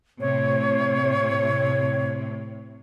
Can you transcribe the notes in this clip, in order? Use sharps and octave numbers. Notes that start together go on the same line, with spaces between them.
A2 C3 C#5